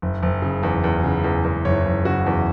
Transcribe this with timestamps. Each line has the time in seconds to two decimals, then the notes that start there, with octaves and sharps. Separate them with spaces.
0.02 F#1
0.23 F#1
0.42 C#3
0.63 E2
0.84 E2
1.04 C#3
1.24 E2
1.44 E2
1.65 F#1 C#5
1.85 F#1
2.05 C#3 F#4
2.26 E2